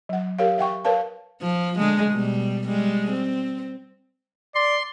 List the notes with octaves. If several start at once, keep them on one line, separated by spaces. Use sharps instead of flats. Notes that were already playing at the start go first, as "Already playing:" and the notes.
F#3 F#5
G4 A#4 C#5 F5
E5 F#5 G5 C#6
A#4 B4 C#5 F5 A5
F3
D3 G#3 A3
B2 G3
G3 G#3
C4
D5 C6